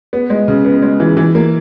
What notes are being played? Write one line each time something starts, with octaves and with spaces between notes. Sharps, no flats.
B3
G#3
C#3
B3
G#3
E3
E3
A#3